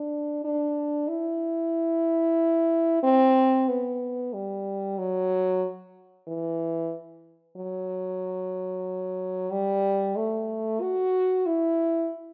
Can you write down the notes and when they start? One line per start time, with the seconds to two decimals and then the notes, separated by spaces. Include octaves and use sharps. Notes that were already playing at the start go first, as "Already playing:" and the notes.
Already playing: D4
0.45 D4
1.08 E4
3.03 C4
3.69 B3
4.33 G3
4.98 F#3
6.28 E3
7.57 F#3
9.51 G3
10.16 A3
10.81 F#4
11.46 E4